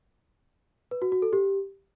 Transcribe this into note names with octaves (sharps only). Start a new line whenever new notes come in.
B4
F#4
F#4
A4
G4